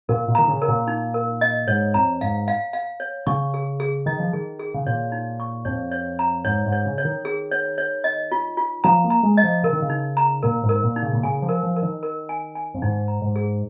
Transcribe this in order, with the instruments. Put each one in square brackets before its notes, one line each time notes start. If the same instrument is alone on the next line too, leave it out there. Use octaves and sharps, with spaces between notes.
[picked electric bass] A#2 [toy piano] A#4
[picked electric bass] A#2
[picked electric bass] D#3 [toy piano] A#5
[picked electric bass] C#3
[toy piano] A#4
[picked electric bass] A#2
[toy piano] D#4
A#4
D#5
[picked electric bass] G#2 [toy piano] C#5
[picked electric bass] F2 [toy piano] A#5
[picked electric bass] G#2 [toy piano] F5
[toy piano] F5
F5
C#5
[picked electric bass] C#3 [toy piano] C#6
[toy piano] G#4
G#4
[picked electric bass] D#3 [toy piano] D#5
[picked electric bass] F3
[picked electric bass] D#3 [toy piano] G#4
[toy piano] G#4
[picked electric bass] C#3
[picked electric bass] A#2 [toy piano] C#5
[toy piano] D#4
C#6
[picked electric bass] F2 [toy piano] C#5
[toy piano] C#5
A#5
[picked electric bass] G#2 [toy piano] C#5
[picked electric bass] G#2
[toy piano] C#5
[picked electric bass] C#3
[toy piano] C#5
[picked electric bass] D#3
[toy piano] G#4
C#5
C#5
D#5
F4
F4
[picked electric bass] F3 [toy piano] A#5
[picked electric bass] A#3
[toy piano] A#5
[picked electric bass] G#3
[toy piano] D#5
[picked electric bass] F3
[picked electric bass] C#3 [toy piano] A#4
[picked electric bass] D#3
C#3
[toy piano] D#4
A#5
[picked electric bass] A#2 [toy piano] A#4
[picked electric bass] G#2
[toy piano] A#4
[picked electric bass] A#2
[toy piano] D#4
[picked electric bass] C#3
A#2
[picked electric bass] C#3 [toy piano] G#5
[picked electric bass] F3
[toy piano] A#4
[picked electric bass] F3
[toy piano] A#4
[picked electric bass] D#3
[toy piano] A#4
G#5
G#5
[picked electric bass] F2
[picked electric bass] G#2 [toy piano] D#4
[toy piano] A#5
[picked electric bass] G#2
[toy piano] G#4